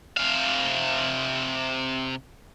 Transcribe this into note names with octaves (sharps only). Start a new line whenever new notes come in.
C3 F5